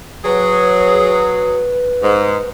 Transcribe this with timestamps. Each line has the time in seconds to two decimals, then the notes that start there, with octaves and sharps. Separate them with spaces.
0.24 F#3 G#4 B4
2.02 G#2